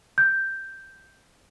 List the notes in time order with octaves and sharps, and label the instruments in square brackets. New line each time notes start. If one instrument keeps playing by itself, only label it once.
[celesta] G6